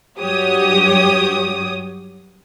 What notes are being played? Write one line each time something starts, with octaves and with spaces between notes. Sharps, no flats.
G2 F#3 F#4 G4 C#5 D#6